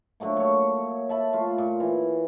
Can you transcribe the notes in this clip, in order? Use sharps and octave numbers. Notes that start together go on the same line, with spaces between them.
D3 F#3 A3 A#3
F#3 C#5
E5 A5 B5
A3 F4
A#2
E3